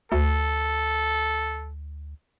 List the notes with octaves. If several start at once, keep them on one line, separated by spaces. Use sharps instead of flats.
D2 A4